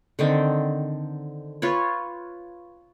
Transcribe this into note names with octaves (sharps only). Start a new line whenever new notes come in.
D3 D#3 C4
F4 B4 C#5